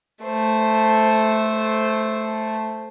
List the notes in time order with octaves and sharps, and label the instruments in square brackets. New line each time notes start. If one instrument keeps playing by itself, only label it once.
[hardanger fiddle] A3 C5